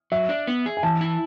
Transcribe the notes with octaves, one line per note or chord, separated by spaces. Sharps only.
F#3 E5
D4
B3
G#4
G#5
E3 A5
E4